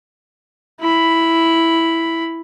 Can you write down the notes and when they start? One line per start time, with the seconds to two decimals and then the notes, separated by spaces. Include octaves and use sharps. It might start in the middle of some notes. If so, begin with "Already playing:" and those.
0.80 E4 B5